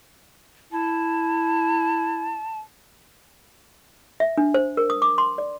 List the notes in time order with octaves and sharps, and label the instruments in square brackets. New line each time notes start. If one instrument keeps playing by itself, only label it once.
[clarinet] E4 [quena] A5
[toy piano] E5
D4
C5
A#4
D#6
D6
C6
D5